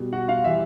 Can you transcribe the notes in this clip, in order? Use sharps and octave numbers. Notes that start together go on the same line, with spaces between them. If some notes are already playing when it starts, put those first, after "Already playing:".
Already playing: B2 G3
F#4 F#5
F4 F5
E3 G3 E5